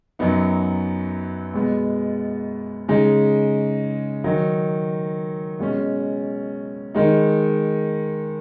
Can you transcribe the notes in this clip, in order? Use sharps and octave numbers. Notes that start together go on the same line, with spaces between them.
F#2 F#3 B3 D#4
B2 G#3 B3
C#3 G#3 D#4
D#3 F#3 D#4
B2 G#3 C#4
D#3 G#3 D#4